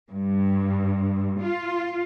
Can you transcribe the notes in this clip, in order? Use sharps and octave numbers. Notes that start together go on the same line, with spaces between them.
G2
F4